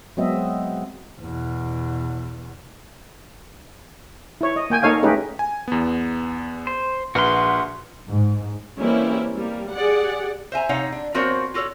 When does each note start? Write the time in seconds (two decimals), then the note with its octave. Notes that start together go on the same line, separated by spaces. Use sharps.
0.17 F#3 G#3 B3 C4 D#5 E5
1.21 E2 B2
4.41 E4 C#5
4.56 D#5
4.70 A#3 G5 G#5
4.82 A#3 D#4 A4 C#5 F5 G#5
5.02 G#3 A3 C#4 D#4 G4 B4
5.39 G#5
5.68 E2 B3
6.67 C5
7.15 A#1 F#4 B4 C6 F6
8.08 G#2
8.78 E3 G3 A#3 C4 C#4 E4
9.35 G3 A#3
9.74 G4 G#4 D5 F#5
10.52 C5 E5 G#5 A#5
10.69 C3 D#4 C#5 F5 F#5
10.92 D4
11.14 F3 C4 F#4 A#4 C5 C#5
11.54 F4 F#4 A4 A#4 C#5